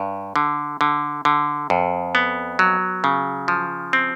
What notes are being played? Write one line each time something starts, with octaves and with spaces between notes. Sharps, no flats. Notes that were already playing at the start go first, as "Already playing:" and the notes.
Already playing: G2
D3
D3
D3
F2
B3
F#3
C#3
F3
C4